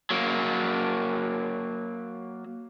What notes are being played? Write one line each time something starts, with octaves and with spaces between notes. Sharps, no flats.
F#3 A#3